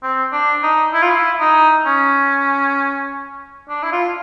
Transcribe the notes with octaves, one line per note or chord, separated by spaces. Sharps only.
C4
D4
D#4
E4
F4
E4
D#4
C#4
D4
E4
F4